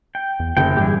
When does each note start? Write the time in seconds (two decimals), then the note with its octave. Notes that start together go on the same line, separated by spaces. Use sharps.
0.15 G5
0.40 E2
0.57 F#1 D3 A#3 G5
0.77 G#2 E3 G3 G4 G#4